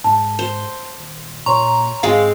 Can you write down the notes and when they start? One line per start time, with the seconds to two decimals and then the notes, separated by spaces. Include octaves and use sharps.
0.04 G#2 A5
0.39 C5
0.98 D#1
1.46 A#2 C#5 A#5 C6 C#6
2.03 G#2 G#3 C4 F5